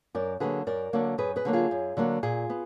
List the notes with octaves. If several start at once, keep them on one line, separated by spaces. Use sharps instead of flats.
F#2 A#4 D5
D3 F#3 A#3 G#4 B4
F#2 A#4 D5
D3 F#3 A#3
F#2 G#4 B4
G#4 B4
D3 F#3 A#3
F4 G#4
F#2
D3 F#3 A#3
A#2 F4 G#4
B3